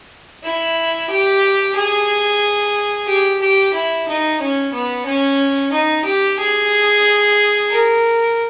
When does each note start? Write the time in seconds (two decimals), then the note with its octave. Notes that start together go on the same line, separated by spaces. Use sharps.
0.44 E4
1.10 G4
1.76 G#4
3.07 G4
3.41 G4
3.74 E4
4.08 D#4
4.40 C#4
4.73 B3
5.06 C#4
5.72 D#4
6.05 G4
6.39 G#4
7.70 A#4